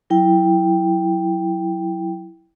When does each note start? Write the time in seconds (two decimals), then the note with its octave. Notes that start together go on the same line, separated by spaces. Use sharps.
0.10 F#3 E4 G5